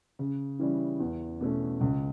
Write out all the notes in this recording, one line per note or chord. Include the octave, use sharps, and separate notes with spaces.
C#3
E3 G3 C#4
E2
B2 A3 C#4
C#2